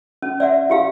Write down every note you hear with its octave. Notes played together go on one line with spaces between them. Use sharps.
C#4
D5 E5 F#5
E4 G4 F5